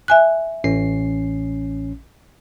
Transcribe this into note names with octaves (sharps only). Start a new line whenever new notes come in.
E5 G#5 F#6
A1 C#4 C7